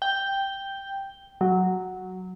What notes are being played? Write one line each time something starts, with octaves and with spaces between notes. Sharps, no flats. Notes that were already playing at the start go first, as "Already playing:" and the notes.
G5
F#3